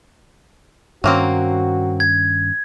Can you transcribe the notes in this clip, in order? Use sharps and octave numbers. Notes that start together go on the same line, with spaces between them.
G2 D#3 F#3 A#3 C4 C#4 F#4
G#6